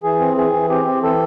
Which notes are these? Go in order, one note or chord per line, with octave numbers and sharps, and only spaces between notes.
E3 G#4
C4
E3 G#4
E3
C4 G4
C4
E3 A4